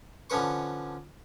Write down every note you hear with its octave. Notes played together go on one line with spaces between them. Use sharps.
D3 F3 C#4 B4 C#6